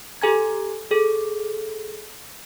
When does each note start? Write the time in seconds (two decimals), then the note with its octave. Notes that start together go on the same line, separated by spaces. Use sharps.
0.22 G4 A4 G#5 A#5 G#6
0.91 G#4 A4